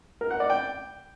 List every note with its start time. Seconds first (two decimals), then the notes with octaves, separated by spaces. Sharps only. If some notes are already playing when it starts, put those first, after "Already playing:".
0.21 A#4
0.31 F#5
0.40 D5
0.50 G5